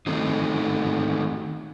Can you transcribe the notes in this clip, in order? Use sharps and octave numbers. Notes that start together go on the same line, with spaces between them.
D#3 A3 C4 D#4